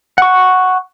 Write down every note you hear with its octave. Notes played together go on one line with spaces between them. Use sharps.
F#5 C#6